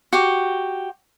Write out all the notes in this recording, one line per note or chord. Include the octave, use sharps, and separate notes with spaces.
F#4 G4